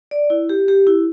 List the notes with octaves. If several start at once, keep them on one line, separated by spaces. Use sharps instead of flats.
D5
E4
G4
G4
E4